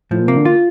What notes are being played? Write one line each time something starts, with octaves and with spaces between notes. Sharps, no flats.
A2 F3
A#2
C3 A#3
D3
F4